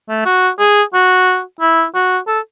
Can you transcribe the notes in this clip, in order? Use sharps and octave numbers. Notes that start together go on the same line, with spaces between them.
A3
F#4
G#4
F#4
E4
F#4
A4